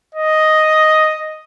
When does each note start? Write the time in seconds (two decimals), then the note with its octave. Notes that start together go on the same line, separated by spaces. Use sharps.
0.15 D#5